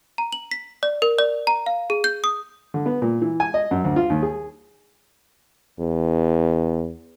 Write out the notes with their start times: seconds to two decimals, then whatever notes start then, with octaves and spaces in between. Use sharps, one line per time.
0.18 A#5
0.33 F#7
0.51 B6
0.83 D5
1.02 A#4
1.18 D5
1.47 A#5
1.66 F5
1.90 G#4
2.04 G6
2.24 D#6
2.74 D3
2.86 B3
3.02 A#2
3.22 E3
3.40 G#5
3.54 D#5
3.71 F#2
3.84 D2
3.96 F4
4.10 D#2
4.22 G#4
5.80 E2